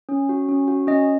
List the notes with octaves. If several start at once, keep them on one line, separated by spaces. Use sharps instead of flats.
C#4
F#4
C#4
F#4
C#4 D#5